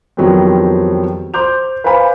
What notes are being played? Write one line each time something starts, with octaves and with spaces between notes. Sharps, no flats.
F2 D#3 F#3 G3 B3 C4
C5 C6 D6 G6 F7
B4 C5 F5 G#5 B5